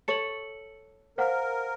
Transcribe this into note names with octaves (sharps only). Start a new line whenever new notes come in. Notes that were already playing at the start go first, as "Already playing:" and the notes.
A4 C#5 C#7 F#7
A#4 C5 F5 F#5